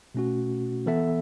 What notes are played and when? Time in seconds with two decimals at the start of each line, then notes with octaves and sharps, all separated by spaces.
0.15 B2 A3 C#4 F#4
0.86 E3 B3 A4 E5